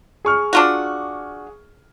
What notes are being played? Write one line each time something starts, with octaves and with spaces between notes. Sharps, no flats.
G#4 C#6 F6
D4 F4 F#4